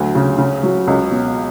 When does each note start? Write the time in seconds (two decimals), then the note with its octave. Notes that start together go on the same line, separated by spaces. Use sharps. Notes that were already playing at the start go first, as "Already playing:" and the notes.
Already playing: D2 F#3
0.15 C#3
0.38 C#3
0.63 F#3
0.87 C#2
1.11 B2